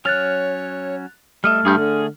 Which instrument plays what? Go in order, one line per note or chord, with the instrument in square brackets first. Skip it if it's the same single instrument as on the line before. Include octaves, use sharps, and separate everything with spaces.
[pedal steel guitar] F#3 C#4 F6 [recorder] C#5 [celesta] F#6 A6 F7
[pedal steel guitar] G3 D#5 E5 [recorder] A3 [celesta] F6
[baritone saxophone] G2 [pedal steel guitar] G#4 D#6 G6
[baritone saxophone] D3 [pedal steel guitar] G#4